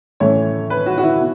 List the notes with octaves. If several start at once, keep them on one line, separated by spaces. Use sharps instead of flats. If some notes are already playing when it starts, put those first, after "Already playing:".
A2 E3 A3 C#4 C#5
B4
F#4
F#4
E4
B2